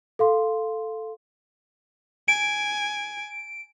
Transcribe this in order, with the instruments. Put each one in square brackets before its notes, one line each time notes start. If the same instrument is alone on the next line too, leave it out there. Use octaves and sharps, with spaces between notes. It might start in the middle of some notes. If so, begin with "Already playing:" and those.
[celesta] A4 F5 C6
[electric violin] G#5 [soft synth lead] D7